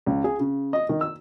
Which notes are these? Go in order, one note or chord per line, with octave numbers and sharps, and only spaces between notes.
C#2
G#4
C#3
D#5
D#3
E6